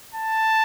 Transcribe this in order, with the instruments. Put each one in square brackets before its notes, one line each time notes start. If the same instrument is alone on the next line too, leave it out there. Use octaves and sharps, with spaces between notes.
[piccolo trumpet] A5